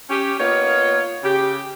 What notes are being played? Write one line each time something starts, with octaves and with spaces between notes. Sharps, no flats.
C#4 G4
A#3 B3 D#4 F4 C#5
C#3 G4